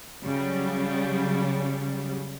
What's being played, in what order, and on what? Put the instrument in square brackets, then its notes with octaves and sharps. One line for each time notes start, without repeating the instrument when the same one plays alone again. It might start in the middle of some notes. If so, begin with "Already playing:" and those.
[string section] C#3 F#3 G3